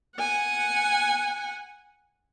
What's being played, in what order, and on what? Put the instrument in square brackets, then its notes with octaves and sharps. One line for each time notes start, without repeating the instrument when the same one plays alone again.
[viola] F#5 G#5